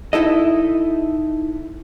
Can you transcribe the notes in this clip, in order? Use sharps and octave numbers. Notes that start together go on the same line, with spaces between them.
D#4 E4 A4 D#5